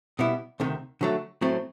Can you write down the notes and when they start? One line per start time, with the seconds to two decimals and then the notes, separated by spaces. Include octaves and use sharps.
0.19 B2 G3 B3 E4
0.60 D2 C3 D#3
1.01 D3 F#3 A3
1.41 A2 F#3 A3 C4